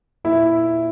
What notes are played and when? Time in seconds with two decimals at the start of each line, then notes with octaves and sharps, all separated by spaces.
0.24 A#2 E4